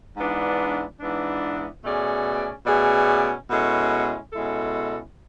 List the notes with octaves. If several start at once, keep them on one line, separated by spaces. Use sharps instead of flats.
G#2 E3 B3 D4
G#2 E3 B3 D4
B2 A3 C#4 G#4 D5
B2 A3 C#4 G#4 D5
B2 G#3 C#4 E4 A4
B2 G#3 C#4 E4 A4